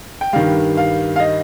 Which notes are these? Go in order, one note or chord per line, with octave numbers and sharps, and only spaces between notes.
G5
G2 D#3 G3 F5
F5
F5
D#5